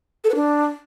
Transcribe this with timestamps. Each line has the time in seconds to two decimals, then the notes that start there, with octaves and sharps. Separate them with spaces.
0.24 A4
0.30 B4
0.35 D4